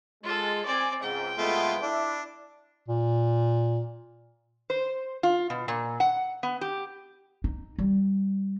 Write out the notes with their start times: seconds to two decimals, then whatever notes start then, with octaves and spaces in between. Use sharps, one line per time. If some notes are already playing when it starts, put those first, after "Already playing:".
0.24 G#3 F4 A4
0.65 C4 D5 G#5
1.02 C#2 G#2 G5
1.38 C2 G#3 A3 B3 F4
1.82 D4 E4 E5
2.88 A#2
4.70 C5
5.23 F4
5.50 B2
5.68 A#2
6.00 F#5
6.43 B3
6.61 G4
7.44 D#4
7.78 G3